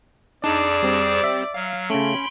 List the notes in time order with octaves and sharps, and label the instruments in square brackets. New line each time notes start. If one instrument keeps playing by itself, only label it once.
[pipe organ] F2 G#4 A5 [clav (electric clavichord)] D4 [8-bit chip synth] D#4 [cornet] D5
[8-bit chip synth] G3 C4
[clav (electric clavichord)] E5
[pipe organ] F#3 [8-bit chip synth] F5
[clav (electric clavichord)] C#3 A3 [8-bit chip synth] C#4 [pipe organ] G5 B5 C6